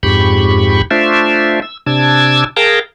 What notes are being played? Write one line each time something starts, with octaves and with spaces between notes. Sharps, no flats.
F2 G#2 G4 B5 C#6
A3 D4 F4 C5 E5
E6
C3 D4 A5 E6 G#6
G#4 A#4 F5 G5 A5 A#5